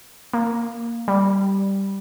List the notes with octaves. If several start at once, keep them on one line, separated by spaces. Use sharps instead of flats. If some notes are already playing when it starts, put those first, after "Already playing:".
A#3
G3